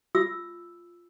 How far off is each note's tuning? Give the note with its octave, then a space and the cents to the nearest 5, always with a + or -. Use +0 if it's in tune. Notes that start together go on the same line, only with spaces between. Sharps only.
F4 +0 E6 +0